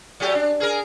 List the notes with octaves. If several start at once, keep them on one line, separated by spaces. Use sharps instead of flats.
F#3 A3 G4
D4
G#4 A#4